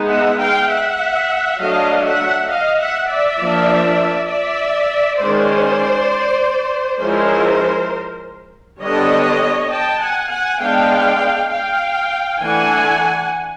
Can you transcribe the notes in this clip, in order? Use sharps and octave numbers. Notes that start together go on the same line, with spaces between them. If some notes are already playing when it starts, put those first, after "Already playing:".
Already playing: G#3 B3 D#4
E5 F#5
F5 G5
E5 F#5
F#3 A3 D4 D#5 F5
E5 F#5
D#5 F5
E5 F#5
D5 E5
F3 A#3 D4
D5 E5
D#3 G#3 C#4 C5 D5
F3 G#3 C#4 E4 A#4 C5
D3 G3 B3 D4 C#5 D#5
G5 A5
F#5 G#5
F#5 G#5
G#3 B3 D4 F5 G5
F5 G5
E3 A3 D4 F#5 G#5